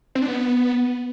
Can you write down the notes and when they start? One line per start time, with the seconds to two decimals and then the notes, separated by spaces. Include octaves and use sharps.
0.15 C4
0.22 D4
0.28 B3